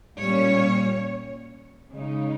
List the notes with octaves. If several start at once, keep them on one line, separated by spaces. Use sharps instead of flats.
A#2 G3 C#4 C#5
C#3 G#3 D#4